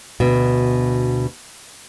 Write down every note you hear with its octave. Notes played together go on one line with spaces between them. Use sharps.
D2 B2